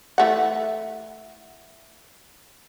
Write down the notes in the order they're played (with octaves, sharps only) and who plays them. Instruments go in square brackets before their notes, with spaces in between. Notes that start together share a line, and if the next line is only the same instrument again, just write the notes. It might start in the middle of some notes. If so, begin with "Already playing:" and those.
[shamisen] E3 A3 F#5